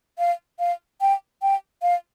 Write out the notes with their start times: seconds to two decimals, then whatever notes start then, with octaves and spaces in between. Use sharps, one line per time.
0.19 F5
0.59 F5
1.01 G5
1.42 G5
1.82 F5